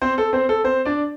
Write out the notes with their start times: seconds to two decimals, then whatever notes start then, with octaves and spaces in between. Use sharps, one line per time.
0.02 C4 C5
0.18 A4
0.33 C4 C5
0.49 A4
0.64 C4 C5
0.85 D4 D5